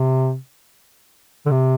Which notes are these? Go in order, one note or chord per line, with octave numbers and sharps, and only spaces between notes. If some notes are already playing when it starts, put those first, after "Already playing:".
Already playing: C3
D3
C3